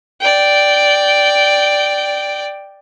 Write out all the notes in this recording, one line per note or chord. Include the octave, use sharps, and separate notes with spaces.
D5 G5